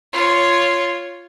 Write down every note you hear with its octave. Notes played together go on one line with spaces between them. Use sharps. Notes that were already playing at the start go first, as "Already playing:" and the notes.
F4 C#5